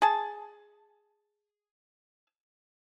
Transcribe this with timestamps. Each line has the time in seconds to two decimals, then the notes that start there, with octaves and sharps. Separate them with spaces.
0.02 G#4 A5